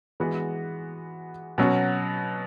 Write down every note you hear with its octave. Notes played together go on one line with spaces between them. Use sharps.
E3 G#3 B3 F#4
B2 F#3 C#4 F#4